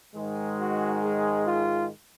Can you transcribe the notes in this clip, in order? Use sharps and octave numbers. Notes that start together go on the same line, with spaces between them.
G#2 D#3 G#3
F#4
G#4
F4